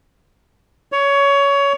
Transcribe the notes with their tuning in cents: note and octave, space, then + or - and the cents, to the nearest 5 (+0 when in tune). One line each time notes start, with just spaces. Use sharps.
C#5 +20